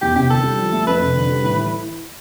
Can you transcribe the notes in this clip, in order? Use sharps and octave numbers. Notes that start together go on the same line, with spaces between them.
E2 G4
C3 G4
D3 A4
G3
F3
A3
F2 B4
C3
D3
G3
A2
E3